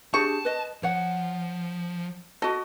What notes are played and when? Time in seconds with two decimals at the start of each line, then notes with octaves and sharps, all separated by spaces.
0.14 D4 G4 G#4 A5 C#6
0.45 B4 D#5
0.83 F3 C#5 F#5
2.42 F#4 A4 D#5